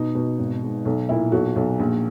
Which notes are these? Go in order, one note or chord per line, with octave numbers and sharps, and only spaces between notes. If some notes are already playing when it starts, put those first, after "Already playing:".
Already playing: B2 D#4
B2
G#1
G#2
B1
A#2 E4
B1 F#4
B1
A#1